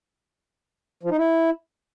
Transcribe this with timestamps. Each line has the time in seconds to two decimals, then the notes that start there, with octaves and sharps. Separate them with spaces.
1.03 F3
1.11 D#4
1.18 E4